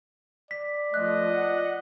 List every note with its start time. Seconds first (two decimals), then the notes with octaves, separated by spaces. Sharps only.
0.51 D5 B6
0.94 F3 A3 D#5 F#6
1.34 F#5